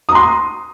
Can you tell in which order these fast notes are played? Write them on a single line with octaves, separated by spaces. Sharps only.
D#6 A#5 C6